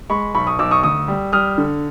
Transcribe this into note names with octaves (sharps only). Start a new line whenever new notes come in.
G#3 B5 C#6
B1 B5 C#6
C#6 D#6
B1 D6 E6
C#6 D#6
D2 C#6 D#6
G3
G3 D#6 F6
D3